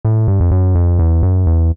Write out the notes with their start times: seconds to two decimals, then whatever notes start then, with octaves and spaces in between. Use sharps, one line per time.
0.05 A2
0.28 G2
0.40 F2
0.51 F#2
0.75 F2
0.99 E2
1.23 F#2
1.47 E2